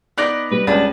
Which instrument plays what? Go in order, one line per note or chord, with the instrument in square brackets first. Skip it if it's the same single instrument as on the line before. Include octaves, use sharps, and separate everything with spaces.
[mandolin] B3 D#4 D5 [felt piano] F#6 A#6
[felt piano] G3 [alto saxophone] B4
[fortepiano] C#2 [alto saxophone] D4 [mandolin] B4